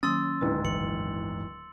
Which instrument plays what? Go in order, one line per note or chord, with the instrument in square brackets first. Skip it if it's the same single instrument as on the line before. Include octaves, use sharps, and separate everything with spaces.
[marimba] D#3 F#3 A#3 [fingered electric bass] C#4 [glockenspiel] C6 E6 A6 [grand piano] D#6
[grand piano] D1 G#2 [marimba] D4 E4 B4
[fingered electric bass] G1 E3 [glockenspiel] C#7 F#7